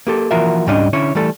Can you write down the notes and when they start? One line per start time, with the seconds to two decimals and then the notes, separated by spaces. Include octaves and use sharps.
0.07 A#3 G4 A4
0.31 E3 F3 A#3 F#4 A#4 E5
0.66 C#2 G#2 G3 C#4 D4 D#5
0.93 D3 C#4 E4 C#5
1.15 E3 G3 A3 A4